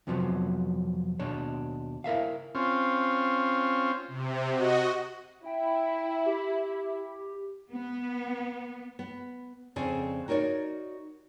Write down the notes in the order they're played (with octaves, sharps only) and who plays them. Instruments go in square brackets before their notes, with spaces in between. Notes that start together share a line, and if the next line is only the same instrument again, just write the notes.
[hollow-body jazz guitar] F2 C3 F3 F#3 B3
D#2 B2 D4 C#5
E4 A#4 E5 F5
[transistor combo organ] C4 C#4 F4
[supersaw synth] C3
F#4 D#5
[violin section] E4 [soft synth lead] G5
[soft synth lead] G4
[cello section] B3
[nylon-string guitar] B3
F2 C#3 C4 D5 G#5
D#4 F#4 A#4 C#5 D5